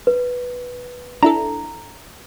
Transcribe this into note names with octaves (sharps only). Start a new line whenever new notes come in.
B4
D4 E4 A4 A#5